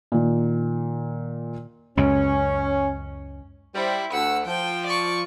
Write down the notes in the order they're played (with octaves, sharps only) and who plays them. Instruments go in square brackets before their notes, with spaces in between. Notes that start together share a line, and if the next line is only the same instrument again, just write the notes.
[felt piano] A#2 D#3
[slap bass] C#2 F#2 [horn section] C#4
[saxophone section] G3 C5 [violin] E4
[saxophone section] D2 F#5 [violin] E6
[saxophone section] F3 [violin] G5
[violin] D5 C#6